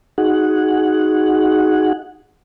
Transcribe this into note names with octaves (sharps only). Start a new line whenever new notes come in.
D#4 F#4 G#4 F#5